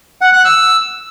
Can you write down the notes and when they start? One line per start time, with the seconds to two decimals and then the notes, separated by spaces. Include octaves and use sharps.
0.21 F#5
0.33 F#6
0.45 E6